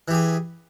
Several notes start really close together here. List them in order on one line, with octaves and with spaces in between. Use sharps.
E3 G4 G#4